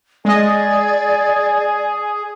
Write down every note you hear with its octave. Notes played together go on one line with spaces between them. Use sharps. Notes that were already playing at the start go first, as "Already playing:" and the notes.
G#3 G#4 D5 D#5 G#5